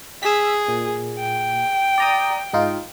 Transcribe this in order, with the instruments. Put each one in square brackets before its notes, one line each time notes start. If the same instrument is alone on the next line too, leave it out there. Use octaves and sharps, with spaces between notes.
[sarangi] G#4 [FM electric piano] E6 B6
[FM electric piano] A#2
[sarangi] G5
[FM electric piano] D5 A#5 D#6
G#2 D#4 F4